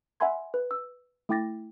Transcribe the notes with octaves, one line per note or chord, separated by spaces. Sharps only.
E5 F#5 G#5 B5 C6 G#6
B4
E6
A3 E4 G5 D6 A6 A#6